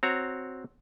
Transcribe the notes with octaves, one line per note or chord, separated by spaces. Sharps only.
C4 F#4 C#5 A#5